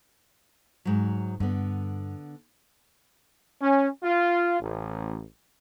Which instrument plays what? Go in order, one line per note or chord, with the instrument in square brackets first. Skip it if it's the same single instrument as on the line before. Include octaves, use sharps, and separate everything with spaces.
[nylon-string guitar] G#2 F#3
[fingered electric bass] G2 [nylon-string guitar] D3 B3
[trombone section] C#4
F4
A1